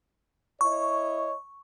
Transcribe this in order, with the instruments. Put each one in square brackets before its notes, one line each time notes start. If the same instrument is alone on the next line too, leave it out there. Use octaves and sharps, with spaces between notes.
[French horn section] E4 C#5 D#5 [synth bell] C#6